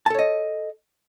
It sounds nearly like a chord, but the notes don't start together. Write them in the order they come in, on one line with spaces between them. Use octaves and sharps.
A5 A4 C#5 D#5